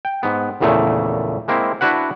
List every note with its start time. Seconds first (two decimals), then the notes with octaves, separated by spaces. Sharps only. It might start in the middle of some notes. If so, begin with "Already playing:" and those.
0.05 G5
0.23 G#2 B3
0.60 A#1 E2 A#2 C#3 A3
1.48 G#3 A#3 C4 E4
1.81 D4 E4 F#4 B4 F#5